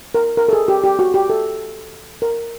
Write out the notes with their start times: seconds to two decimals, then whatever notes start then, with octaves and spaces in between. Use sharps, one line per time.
0.14 A#4
0.37 A#4
0.49 A4
0.53 G#4
0.68 G4
0.84 G4
0.99 F#4
1.14 G4
1.30 A4
2.22 A#4